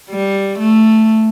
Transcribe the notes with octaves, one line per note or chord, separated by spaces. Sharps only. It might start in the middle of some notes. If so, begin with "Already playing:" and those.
G3
A3